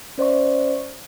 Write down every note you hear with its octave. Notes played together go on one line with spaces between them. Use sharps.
C#4 C5 D5 E5 C#6